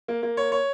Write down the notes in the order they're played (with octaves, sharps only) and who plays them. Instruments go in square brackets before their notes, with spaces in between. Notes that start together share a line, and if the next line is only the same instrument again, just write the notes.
[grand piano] A#3
A#3
C#5
C#5